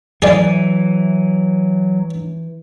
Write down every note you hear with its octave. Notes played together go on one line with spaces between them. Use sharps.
E3 F#3 G#4 D5